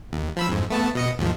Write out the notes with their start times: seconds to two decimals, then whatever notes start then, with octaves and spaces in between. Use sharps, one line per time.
0.13 D#2
0.37 F3 B5 E6
0.49 F2 G#2
0.70 A3 B3 A5
0.95 B2 D#5 C#7
1.18 D#2 G#2 F3